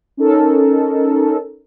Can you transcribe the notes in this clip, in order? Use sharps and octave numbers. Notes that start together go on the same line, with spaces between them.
C#4 D#4 A4 A#4